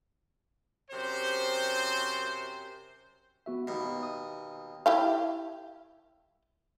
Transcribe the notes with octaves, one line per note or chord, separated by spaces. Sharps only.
F#2 C3 C5
B3 F#4 E5
D#2 B2
D#6
E4 G4 F5